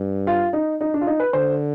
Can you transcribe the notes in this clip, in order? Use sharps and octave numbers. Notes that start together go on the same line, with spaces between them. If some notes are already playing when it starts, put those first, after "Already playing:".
Already playing: G2
F4
D#4
D#4
D4
F4
D#4
B4
D3 C5